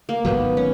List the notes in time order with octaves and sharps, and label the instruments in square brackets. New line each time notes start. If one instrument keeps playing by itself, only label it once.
[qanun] A#3
[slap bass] G#1 G#2 D#3 F#3 [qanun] B3
[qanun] C#4